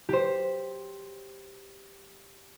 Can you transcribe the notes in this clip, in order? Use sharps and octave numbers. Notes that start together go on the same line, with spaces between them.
G4 C5